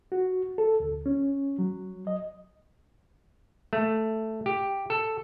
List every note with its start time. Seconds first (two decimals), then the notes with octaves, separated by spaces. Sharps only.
0.12 F#4
0.58 A4
0.80 D2
1.06 C#4
1.58 F#3
2.07 D#5
3.73 A3
4.46 G4
4.90 A4